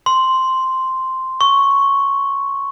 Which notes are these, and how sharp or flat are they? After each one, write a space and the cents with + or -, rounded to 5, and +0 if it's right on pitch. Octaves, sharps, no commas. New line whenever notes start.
C6 -5
C#6 +0